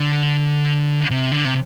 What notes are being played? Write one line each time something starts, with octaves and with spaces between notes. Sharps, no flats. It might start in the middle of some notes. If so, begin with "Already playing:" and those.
Already playing: D3
C3
D3
C3